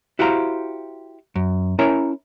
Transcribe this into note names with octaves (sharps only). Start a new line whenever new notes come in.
E4 F#4 G4 C5 F5 A#5
F#2
C#4 E4 A#4 C#5 E5 A#5